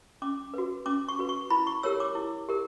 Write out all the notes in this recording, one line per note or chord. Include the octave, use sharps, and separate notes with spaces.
C#4 D6
F#4 B4
C#4 D6
C#6
F#4 B4
C#6
E4 B5
C#6
G4 A#4 C#5 E6
D6
E4
G4 A#4